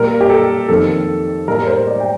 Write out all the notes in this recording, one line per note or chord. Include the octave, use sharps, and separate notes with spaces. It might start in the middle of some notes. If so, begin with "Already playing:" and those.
Already playing: A#2 G3 A#3 A#4
G4
A4
F2 D#3 A#3 A4
A2 G3 A#3 A#4
A#4
C5
D5
G5